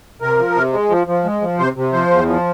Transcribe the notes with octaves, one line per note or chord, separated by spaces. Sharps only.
C3 A#4
F3
C3
G#3
F3
F3
G#3
F3
C3 C5
C3
F3 C5
E2
F3